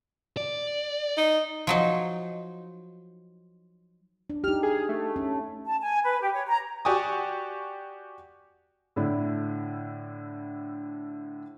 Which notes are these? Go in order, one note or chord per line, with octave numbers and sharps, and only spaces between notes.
D5
D#4
F3 F#3 D#4
D4
D#4 G4 F6
G#4
A3
C#4
A5
G#5
B4
G4
C#5
A#5
F#4 G4 D5 G#5 C#6 D#6
A2 D3 D4 E4